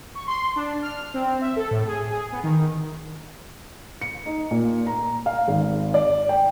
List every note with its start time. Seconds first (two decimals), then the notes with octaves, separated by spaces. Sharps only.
0.15 C#6
0.27 C6
0.56 D4
0.82 F6
1.14 C4
1.41 E5
1.56 A4
1.71 A2
1.87 G#4
2.10 G#4
2.32 B3
2.43 D#3
4.01 C#7
4.26 D#4
4.51 A#2
4.87 A#5
5.26 F5
5.48 G#1
5.94 D5
6.29 G5